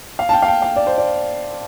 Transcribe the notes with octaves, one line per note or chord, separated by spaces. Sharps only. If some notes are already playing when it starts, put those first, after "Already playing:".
F5
A5
G5
F5
G5
F5
D5
C5
D5